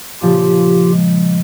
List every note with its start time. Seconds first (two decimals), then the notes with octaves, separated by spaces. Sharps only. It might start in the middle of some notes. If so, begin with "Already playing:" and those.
0.22 A#2 C#3 F3 F4 G4
0.92 G#3